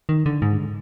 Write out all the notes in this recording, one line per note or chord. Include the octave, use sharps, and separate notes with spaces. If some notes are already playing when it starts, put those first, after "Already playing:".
D#3
D3
G#2